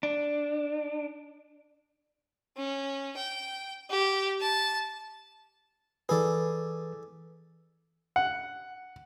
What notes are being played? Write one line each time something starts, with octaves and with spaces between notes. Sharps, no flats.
D4
C#4
G5
G4
A5
E3 G#4 A4 B4 D5
F#5